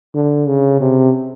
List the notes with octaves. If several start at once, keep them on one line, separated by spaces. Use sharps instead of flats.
D3
C#3
C3